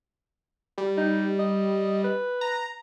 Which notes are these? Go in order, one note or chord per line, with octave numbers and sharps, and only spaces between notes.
G3
D#4
D#5
B4
A#5